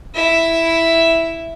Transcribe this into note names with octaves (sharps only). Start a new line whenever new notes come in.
E4 E5